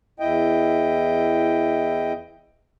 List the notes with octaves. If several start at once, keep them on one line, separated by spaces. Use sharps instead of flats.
E2 E4 D#5 G5